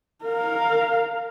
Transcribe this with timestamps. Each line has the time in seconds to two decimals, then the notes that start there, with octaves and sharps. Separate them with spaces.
0.25 A#4 F5